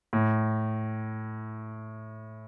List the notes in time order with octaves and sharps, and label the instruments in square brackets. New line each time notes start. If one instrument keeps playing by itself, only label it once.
[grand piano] A2